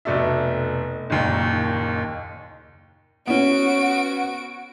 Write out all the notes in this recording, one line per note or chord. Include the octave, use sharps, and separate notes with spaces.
F1 B2 A3 D5 E5
F#1 D#2 A#2
B3 C#4 F#4 D7